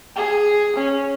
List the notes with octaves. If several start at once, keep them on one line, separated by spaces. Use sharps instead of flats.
G#4
C#4